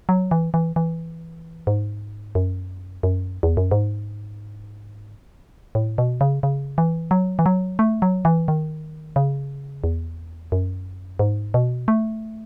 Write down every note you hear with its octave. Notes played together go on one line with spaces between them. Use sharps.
F#3
E3
E3
E3
G#2
F#2
F#2
E2
F#2
G#2
A2
B2
C#3
C#3
E3
F#3
E3
F#3
A3
F#3
E3
D#3
C#3
E2
F#2
G#2
B2
A3